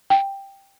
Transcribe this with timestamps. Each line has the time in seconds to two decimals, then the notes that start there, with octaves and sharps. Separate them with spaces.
0.10 G5